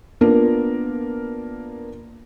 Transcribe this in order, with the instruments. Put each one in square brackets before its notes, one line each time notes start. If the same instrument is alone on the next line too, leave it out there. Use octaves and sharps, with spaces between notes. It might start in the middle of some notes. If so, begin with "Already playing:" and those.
[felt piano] A#3 B3 D4 F4 A#4